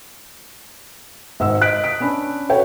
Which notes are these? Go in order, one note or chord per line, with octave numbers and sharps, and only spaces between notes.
G#1 G#2 E6
D#5 F#6 B6 D7
D#6 B6 D7
C#4 D4 B5
F#4 A4 B4 C#5 G5